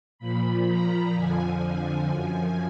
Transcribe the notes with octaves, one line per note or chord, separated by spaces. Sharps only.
A#2 F3 B5
A#5
F2 D3 F3 G#5
G#5
F#2 F3